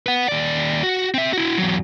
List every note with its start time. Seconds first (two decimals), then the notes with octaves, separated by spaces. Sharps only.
0.06 B4 F#5
0.28 D#2 D5
0.83 F#4
1.14 C4 E5
1.33 E4 F#4
1.58 E2 F#3